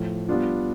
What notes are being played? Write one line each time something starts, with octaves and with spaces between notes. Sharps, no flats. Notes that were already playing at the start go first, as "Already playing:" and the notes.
Already playing: A2 F3 A3
G3 B3 D4 F4